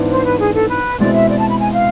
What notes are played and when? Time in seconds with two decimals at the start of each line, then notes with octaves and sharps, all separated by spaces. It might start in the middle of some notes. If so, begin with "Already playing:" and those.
Already playing: G#2 E3 B3 D4
0.09 C5
0.24 B4
0.39 G#4
0.54 A4
0.69 B4
0.98 B2 G#3 C4 E4 D5
1.13 E5
1.28 D5
1.38 A5
1.49 B5
1.59 G#5
1.73 F5